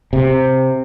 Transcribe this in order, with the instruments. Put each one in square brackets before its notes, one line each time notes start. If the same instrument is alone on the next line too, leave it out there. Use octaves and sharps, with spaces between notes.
[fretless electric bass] C3